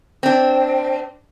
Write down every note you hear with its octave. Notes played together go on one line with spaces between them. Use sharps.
C4 D4